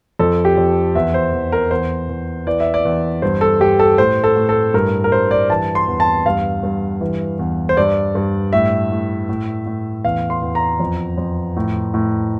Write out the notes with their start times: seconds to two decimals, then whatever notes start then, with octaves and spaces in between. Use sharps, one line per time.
0.19 F2 A4
0.45 G4
0.57 F2
0.95 E2 E5
1.14 C5
1.33 E2
1.52 A#4
1.71 E2 C5
2.09 E2
2.47 E3 D5
2.60 E5
2.74 D5
2.85 E2
3.22 G2 C5
3.41 A4
3.60 G2 G4
3.79 A4
3.98 A2 C5
4.24 A4
4.36 A2
4.49 A4
4.74 G2 A#4
5.04 A#4
5.12 G2 C5
5.31 D5
5.50 E3 A5
5.75 C6
5.88 E2
6.00 A5
6.26 G2 F5
6.63 G2
7.01 E3
7.39 E2
7.69 C5
7.77 G2 D5
8.15 G2
8.53 A2 E5
8.91 A2
9.29 A2
9.66 A2
10.05 E2 F5
10.30 C6
10.42 E2
10.55 A#5
10.80 F2
11.18 F2
11.56 A2
11.94 A2